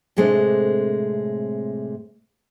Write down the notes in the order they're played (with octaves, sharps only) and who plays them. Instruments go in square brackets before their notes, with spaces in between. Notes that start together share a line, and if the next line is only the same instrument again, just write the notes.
[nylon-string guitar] A2 C3 G#3 A3 C4 D4